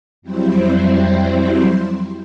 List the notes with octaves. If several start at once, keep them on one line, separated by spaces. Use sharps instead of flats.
F2 F#3 G3 C4 E4 C5